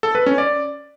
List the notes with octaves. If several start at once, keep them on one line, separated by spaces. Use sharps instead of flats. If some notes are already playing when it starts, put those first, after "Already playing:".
A4
B4
C#4
D5